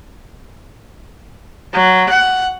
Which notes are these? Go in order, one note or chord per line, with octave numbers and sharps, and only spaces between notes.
F#3
F#5